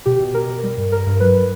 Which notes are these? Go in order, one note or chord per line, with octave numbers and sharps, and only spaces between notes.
B2 G4
B2
B2 A#4
B2
G3
G2
G2 A#4
G2
F#3 B4